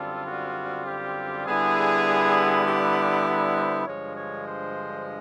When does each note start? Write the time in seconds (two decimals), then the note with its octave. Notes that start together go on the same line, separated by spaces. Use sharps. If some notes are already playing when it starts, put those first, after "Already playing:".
Already playing: F#2 D3 G3 C4 F4 A4
0.27 F#4
0.87 G4
1.47 D3 G3 B3 E4 G#4
2.66 G4
3.27 G#4
3.56 C5
3.86 G2 D3 F3 G#3 C#5
4.17 C#5
4.46 C5